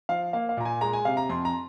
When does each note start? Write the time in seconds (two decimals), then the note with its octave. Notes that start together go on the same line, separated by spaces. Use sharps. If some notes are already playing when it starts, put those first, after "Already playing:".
0.09 F3 F5
0.33 A#3 F5
0.49 F5
0.57 A#2 A#5
0.65 G#5
0.81 G#3 A#5
0.93 G#5
1.05 C3 F5
1.17 A#5
1.29 F2 C6
1.45 A#5